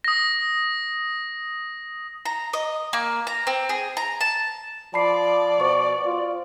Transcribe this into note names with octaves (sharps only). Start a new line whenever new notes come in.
D#6 A#6
A#5
D#5
A#3
A#5
C4
G#4
A#5
A5
F3 D5 A5 B5 C7
B2 C5 C#6
F4